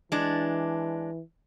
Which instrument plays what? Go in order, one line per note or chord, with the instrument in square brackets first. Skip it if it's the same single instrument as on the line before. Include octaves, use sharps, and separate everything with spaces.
[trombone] E3 [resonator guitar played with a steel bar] G#3 D4